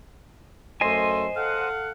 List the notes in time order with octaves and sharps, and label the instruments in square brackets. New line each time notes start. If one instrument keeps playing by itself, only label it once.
[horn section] F#2 A3 C6 [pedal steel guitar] C5 D#5 G#5
[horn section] A4 F5 F#5